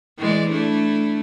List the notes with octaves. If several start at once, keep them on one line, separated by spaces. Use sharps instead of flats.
E3 G#3 D5
A3 D4 E4